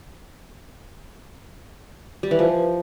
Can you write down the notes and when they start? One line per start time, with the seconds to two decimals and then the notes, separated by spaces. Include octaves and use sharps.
2.23 G3
2.31 E3
2.39 F3